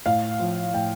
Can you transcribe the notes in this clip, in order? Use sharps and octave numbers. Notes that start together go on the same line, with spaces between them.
A2 F5
F3
A2 G5